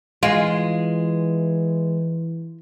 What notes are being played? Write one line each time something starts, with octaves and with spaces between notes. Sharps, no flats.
E3 G#3 F4